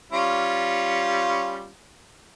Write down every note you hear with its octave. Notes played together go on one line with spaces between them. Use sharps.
G3 C#4 F4